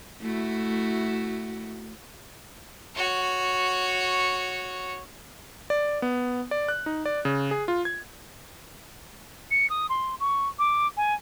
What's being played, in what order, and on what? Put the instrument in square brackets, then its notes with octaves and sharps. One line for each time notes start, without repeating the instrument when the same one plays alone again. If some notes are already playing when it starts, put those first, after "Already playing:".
[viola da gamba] A3 E4 F#4
[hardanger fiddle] F#4 C#5
[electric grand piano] D5
B3
D5
F#6
D#4
D5
C#3
G#4
F4
G#6
[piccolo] C#7
D#6
C6
C#6
D6
G#5